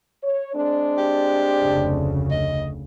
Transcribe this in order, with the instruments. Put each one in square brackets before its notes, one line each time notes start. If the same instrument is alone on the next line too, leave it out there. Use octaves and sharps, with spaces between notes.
[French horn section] C#5
G#3 C4 D4
[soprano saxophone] G4
[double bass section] F1 D2 C#3
[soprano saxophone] D#5